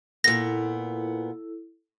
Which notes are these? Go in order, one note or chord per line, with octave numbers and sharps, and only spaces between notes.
A#2 B3 E4 A4 A#6